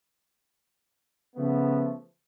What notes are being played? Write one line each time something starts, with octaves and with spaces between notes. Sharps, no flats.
C#3 F3 A3 B3